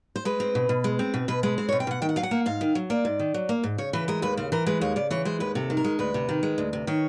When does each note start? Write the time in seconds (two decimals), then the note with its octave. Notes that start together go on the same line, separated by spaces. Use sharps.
0.16 C5
0.25 G#3 B4
0.40 C4
0.55 B2
0.69 B2
0.84 G#3
0.99 C4
1.14 B2
1.28 B2 B4
1.43 G#3 B4
1.58 C4 C5
1.69 C#5
1.72 B2
1.80 G5
1.87 B2 F#5
2.02 D#3 G5
2.09 F#5
2.16 F#3 F5
2.23 F#5
2.31 A#3
2.46 G#2 F5
2.61 D#3
2.75 F#3
2.90 A#3 D5
3.05 G#2
3.19 D#3
3.34 F#3
3.49 A#3
3.64 G#2
3.78 C#3 C#5
3.93 E3 B4
4.08 G#3 A#4
4.22 D#2 B4
4.37 C#3 C5
4.52 E3 A#4
4.67 G#3 B4
4.81 D#2 C#5
4.96 C#3 D5
5.10 E3 C#5
5.25 G#3 C5
5.40 D#2 B4
5.55 C3 A4
5.70 D#3
5.77 A#4
5.84 G#3
5.99 D2 B4
6.14 C3
6.29 D#3
6.43 G#3
6.58 D2
6.73 C3
6.87 D#3 C#5